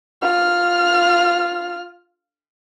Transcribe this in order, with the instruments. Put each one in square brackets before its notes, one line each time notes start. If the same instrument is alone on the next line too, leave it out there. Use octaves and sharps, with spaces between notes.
[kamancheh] F4 F6